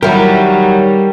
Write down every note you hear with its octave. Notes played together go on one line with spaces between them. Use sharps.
D#3 F#3 G3 E4 G4 A#4